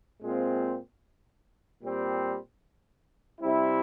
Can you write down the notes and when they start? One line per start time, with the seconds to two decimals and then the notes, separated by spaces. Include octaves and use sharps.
0.21 A#2 G#3 C4 F4
1.81 A#2 G3 C4
3.41 C3 G3 C4 E4